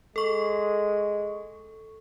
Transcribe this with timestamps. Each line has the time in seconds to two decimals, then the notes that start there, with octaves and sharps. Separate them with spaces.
0.16 G#3 A4 C#6